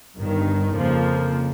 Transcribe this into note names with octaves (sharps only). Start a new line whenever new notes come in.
G1 G2 D#3
F2 C#3 F3 A#3